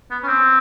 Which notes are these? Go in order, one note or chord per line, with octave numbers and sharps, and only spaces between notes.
B3
C#4
C4